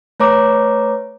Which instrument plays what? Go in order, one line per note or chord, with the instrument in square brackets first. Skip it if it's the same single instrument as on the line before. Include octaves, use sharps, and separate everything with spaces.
[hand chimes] A3 B4 C#5 A#5 D6